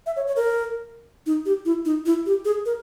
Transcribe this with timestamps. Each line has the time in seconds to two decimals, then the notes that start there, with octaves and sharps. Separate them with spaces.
0.06 E5
0.16 C#5
0.27 C#5
0.36 A#4
1.26 D#4
1.46 G4
1.65 E4
1.85 D#4
2.06 E4
2.26 G4
2.45 G#4
2.66 A#4